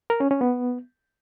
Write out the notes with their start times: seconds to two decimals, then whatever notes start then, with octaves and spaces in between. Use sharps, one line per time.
0.10 A#4
0.20 C#4
0.31 C#4
0.41 B3